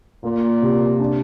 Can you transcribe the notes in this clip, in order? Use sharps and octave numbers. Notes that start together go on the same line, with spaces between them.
A#2 A#3
C3
D4